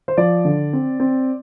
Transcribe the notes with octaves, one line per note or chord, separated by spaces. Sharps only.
C5
F3 D5
D3
C4
C4